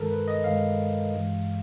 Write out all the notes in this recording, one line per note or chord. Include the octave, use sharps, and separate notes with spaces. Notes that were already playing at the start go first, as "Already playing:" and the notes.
Already playing: G2 D#3 G#3 A4 A#4
B4
D#5
G2 D#3 G#3 F5
G2 E3 G#3